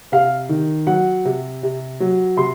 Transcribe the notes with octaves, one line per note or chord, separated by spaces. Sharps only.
C3 F5
D#3
F#3 F#5
C3
C3
F#3
C3 C6